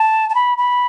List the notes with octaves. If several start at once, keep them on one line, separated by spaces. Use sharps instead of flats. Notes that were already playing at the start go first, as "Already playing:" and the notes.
Already playing: A5
A5
B5
B5